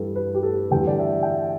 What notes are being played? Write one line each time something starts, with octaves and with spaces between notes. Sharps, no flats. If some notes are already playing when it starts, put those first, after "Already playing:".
Already playing: G2 E3 G3 A4
B4
G4
A4
E2 D3 G3 G5
D5
E5
G5
E5